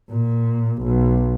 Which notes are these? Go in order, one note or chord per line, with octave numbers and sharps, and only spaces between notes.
A#2
B1